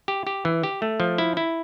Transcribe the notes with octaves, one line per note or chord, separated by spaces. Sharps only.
G4
G4
E3
G4
A3
F3
E4
E4